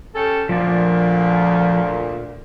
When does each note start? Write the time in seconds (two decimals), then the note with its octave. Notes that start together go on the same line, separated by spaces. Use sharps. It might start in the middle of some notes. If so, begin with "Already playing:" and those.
0.13 C#4 G4 A4
0.49 D2 A#2 F3 D5